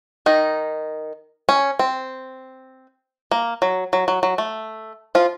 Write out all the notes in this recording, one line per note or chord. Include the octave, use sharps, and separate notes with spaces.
D#3 D#4
C#4
C4
A#3
F#3
F#3
F#3
F#3
A3
F3 F4